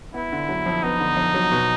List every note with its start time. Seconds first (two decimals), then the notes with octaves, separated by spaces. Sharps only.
0.14 B3 E4
0.32 D3
0.49 F#3
0.66 F2
0.83 B3 D#4
1.00 D3
1.17 F2
1.34 F#3
1.52 B2